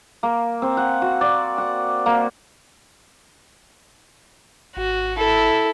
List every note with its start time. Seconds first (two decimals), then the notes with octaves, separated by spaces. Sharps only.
0.23 A#3
0.62 C4
0.77 F#5
1.02 F#4
1.21 D5
1.58 F#5
2.06 A#3
4.77 G#1 F#4
5.17 E4 A4